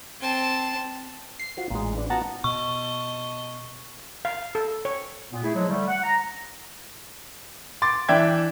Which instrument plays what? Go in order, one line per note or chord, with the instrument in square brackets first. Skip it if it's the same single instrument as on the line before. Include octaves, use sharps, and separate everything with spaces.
[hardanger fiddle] C4 A5
[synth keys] C7
[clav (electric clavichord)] F4 F#4 C5
[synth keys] A1 [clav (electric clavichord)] A#2 G#3
[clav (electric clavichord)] D4 B4
[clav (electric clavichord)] B3 F4 F#4 [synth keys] F#5 A5 A#5
[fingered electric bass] B2 [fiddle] D#5 A5 [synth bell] C#6
[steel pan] F5
A4
C#5
[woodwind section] A#2 B3
A3 E4 G#4
F3 F#3 G#3
D3 G3 A3
F#5
A#5
[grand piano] C6 D6 A6
E3 D4 E5 G5 G#6